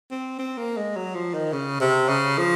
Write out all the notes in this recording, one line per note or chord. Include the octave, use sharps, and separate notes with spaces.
C4
C4
A#3
G#3
F#3
F3
D#3
C#3
C3
C#3
F3